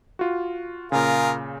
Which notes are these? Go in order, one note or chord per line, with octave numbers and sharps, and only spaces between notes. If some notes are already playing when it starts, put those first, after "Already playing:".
F4 F#4
A#2 C#3 F4 G#4 A#4